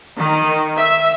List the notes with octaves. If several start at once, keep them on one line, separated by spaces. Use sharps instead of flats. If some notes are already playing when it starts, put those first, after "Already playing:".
D#3
E5